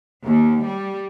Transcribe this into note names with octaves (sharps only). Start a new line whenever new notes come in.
D#2
G3